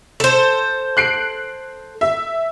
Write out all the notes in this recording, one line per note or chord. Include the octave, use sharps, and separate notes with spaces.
A4 C5
F#6 C7 D7
E5